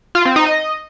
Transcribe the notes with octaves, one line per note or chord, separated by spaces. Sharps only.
F4
C4
D#4
D#5